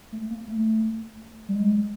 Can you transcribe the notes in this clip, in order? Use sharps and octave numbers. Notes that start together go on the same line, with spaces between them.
A3
A#3
A3
G3
G#3